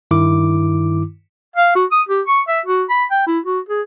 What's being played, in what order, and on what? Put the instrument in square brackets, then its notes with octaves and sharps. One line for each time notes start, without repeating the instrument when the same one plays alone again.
[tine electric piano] G2 D#3 E4 D6
[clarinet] F5
F#4
D#6
G4
C#6
E5
F#4
B5
G5
E4
F#4
G#4